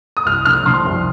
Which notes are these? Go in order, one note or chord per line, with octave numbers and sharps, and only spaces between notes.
D#6
C2 F6
F3 F6
F3 C6
C2